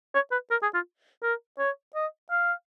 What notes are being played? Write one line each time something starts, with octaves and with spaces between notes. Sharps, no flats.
C#5
B4
A#4
G#4
F4
A#4
C#5
D#5
F5